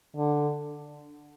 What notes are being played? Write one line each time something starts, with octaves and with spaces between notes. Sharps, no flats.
D3